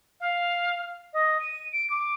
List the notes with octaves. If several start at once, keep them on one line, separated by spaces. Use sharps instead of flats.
F5
D#5
D#7
D7
D6